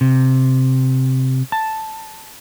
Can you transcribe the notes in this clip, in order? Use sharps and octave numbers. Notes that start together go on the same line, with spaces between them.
C3
A5